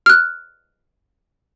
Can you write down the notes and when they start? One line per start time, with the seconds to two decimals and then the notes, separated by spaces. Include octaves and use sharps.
0.06 F6 F#6